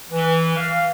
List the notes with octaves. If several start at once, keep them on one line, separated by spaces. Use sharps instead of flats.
E3
F5